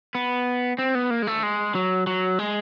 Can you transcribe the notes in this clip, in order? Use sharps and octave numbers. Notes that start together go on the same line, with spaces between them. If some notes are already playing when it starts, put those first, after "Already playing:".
B3
C4
B3
A#3
G#3
A3
G#3
F#3
F#3
G#3